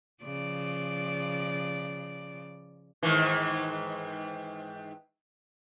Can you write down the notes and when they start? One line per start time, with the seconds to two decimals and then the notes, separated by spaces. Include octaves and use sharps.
0.23 C#3 F3 D5
3.03 G#2 D#3 E3